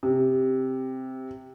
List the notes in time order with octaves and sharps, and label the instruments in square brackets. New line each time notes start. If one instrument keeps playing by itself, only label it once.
[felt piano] C3